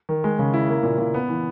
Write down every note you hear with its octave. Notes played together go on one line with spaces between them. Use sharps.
D#3
G#3
C#3
E4
A#3
A#2
A#2
B3
E3